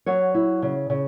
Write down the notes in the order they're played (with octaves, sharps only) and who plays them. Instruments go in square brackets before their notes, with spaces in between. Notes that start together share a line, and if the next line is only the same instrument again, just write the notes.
[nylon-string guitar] F#3 C#5
E4
C#3
C#3